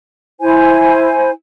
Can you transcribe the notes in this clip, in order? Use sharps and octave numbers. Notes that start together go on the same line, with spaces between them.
E4 C5 G#5